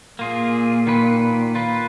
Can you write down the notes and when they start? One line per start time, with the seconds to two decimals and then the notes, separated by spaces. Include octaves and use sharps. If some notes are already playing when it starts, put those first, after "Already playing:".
0.19 A#2 A#3 F4 G#4
0.87 D#3 A#3 F4 B4
1.55 A#3 F4 B4